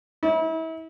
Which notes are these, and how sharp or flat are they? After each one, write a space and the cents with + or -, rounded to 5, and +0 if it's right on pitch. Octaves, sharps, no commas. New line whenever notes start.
E4 -35